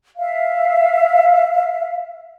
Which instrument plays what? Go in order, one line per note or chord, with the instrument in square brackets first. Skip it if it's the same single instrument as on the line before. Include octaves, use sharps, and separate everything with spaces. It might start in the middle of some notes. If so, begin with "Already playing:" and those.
[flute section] E5 F5